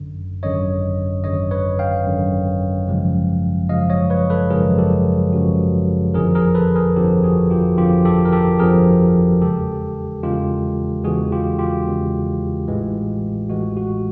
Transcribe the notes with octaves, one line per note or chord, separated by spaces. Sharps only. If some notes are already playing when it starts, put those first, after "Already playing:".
Already playing: G#1 F#2 D3
G#1 F#2 D3 C#5 D#5
G#1 F#2 D3 C#5 D#5
B4 C#5
F5 G5
G#1 F#2 D3
G#1 F#2 C#3 F3 G#3
G#1 F#2 C#3 F3 G#3 D#5 F5
C#5 D#5
B4 C#5
A4 B4
G#1 F#2 C#3 F3 G#3 G#4 A#4
G4 A4
G#1 F#2 C#3 F3 G#3 F#4
G1 F2 D3 F3 G#4 A#4
G#4 A#4
A4 B4
G#4 A#4
G1 F2 D3 F3 G4 A4
F#4 G#4
F4 G4
G1 F2 D3 F3 F4 G4
G4 A4
A#4
G4 A4
G1 F2 D3 F3 G#4 A#4
E2 C#3 E3 G#3 G4 A4
E2 C#3 E3 G#3 F4 G4
E2 C#3 E3 G#3 F#4 G#4
F4 G4
F4 G4
E2 C#3 E3 G#3
A1 A2 E3 G#3
A1 A2 E3 G#3 F#4
F#4